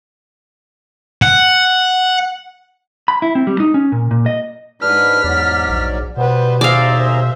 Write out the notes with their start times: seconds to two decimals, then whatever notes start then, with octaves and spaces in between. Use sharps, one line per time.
1.22 F#5
3.08 B5
3.22 E4
3.35 C4
3.47 G3
3.60 D#4
3.74 C#4
3.92 A#2
4.11 A#2
4.26 D#5
4.82 G#2 D4 B4 F6 B6
5.24 E2 G#2 F#3 D5
5.70 A#1
6.17 B2 G3 B3 B4 C5
6.61 D#2 G#4 C5 D5 E5 F5 A#5